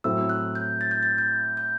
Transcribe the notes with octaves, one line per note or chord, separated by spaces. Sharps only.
A2 F#3 A3 C4 E4 E6
F#6
G6
A6
G6
A6
G6
G6